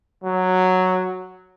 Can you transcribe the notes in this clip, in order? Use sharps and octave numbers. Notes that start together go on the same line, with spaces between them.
F#3